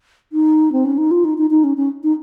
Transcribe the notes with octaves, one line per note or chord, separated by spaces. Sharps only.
D#4
C4
C#4
D#4
F4
D#4
D#4
D#4
C#4
C#4
D#4